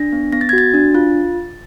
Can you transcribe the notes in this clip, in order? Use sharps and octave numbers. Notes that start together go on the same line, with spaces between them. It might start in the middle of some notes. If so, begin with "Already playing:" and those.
Already playing: D4 A#6
B3
B3 A#6
A6
G#6
F#4 A6
D4
F4